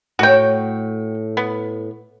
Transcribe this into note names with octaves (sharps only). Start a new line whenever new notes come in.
A2 F#4 C#5 G5
B3